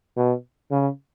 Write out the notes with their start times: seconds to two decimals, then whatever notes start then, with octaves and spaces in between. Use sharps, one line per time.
0.16 B2
0.71 C#3